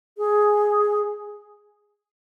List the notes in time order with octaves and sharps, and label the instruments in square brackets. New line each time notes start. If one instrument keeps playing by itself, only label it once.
[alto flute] G#4